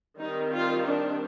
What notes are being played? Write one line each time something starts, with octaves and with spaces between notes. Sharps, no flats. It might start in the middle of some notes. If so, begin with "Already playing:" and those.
D#3 G3 C4 D#4
F4
D4